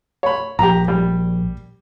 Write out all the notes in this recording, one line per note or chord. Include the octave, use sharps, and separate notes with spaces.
C#5 B5
A#1 G4 A#5
G3